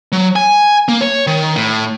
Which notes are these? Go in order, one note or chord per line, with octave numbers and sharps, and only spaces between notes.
F#3
G#5
A#3
C#5
D#3
A2